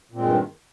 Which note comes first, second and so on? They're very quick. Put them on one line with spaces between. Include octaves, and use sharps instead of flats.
A#2 C4 G#3 G2 D#3